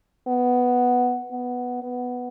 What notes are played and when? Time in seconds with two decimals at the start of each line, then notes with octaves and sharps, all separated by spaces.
0.28 B3
1.32 B3
1.83 B3